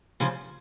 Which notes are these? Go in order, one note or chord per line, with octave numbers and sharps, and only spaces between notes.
C#3 F3